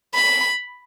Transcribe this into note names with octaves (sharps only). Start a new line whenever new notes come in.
B5